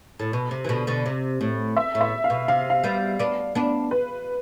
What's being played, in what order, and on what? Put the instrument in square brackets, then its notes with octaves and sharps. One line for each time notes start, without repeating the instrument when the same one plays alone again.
[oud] A2
B2
C3
E3
B2 D3
B2 D3
C3
A2
[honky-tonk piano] E5
[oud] A2
[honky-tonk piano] E5
F5
[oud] B2
[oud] C3 [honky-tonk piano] F5
[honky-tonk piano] F5
[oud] G3 B3
B3 D4
B3 D4
[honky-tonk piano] B4